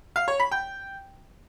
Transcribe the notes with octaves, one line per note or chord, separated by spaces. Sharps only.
F5
C#5
B5
G5